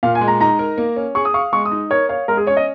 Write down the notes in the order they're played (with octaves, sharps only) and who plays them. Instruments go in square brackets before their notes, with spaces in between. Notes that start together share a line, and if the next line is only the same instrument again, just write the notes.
[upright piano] A#2 [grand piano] F5
[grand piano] G#5
[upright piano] G#3
[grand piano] A#5
[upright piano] D#4 [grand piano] A#5
[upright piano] A#4
A#3
C#4
[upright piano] G#4 [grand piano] C#6
[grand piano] D#6
[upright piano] F5 [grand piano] C#6
[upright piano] G#3 [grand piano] C#6
[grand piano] D#6
[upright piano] D#4
[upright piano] A#4 [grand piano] C#5
[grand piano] C#5 [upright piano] F5
[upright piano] G#3 [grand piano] A#4
[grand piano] G#4
[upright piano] C#4 [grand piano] C#5
[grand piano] D#5